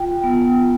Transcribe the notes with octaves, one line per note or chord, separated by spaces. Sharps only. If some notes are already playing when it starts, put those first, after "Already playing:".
Already playing: F4 G5
B3